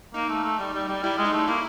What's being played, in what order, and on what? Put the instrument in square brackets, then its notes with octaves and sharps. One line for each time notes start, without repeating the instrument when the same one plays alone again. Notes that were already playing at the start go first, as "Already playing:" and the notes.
[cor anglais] A#3 [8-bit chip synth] D#4
[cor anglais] A3
A3
G3
G3
G3
[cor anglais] G3 [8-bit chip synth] E4
[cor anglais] G#3
[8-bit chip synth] D#4
[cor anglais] A3
[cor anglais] A#3 [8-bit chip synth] E4